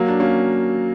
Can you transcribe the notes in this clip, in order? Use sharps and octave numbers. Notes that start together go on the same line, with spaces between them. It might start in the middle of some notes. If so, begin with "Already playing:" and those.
Already playing: F#3 A#3
D4
A#3 C#4